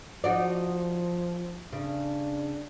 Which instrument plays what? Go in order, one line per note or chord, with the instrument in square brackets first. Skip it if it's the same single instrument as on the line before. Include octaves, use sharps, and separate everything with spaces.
[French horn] F3 [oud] D#4 F#4 D5
[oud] C#3 [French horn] D4